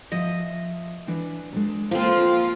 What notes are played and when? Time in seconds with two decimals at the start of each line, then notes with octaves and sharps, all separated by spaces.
0.12 F3 D#5 E5
1.07 E3 D4 B4
1.53 G#3 D4 A4
1.91 F3 A#3 C4 F4 A4